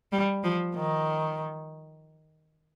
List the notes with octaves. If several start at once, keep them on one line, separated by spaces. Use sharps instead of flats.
G3
F3
D#3